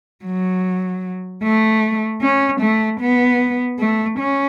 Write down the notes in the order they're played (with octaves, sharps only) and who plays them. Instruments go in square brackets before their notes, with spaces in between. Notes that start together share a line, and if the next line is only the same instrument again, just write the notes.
[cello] F#3
A3
C#4
A3
B3
A3
C#4